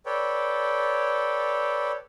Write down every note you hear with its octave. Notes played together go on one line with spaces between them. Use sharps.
A4 B4 C#5 D5 G5